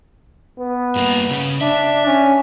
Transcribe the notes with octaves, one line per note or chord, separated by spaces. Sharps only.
B3
G2 A#3
C#3
D4 E5
C#4